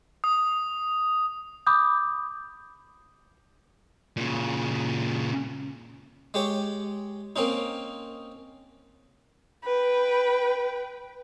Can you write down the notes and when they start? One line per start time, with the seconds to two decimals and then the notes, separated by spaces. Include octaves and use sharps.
0.24 D#6
1.67 B5 D6 D#6 G6
4.17 A#2 C#3
6.34 G#3 G4 C#5
7.36 A#3 C4 C#4 D#4
9.64 B4 G5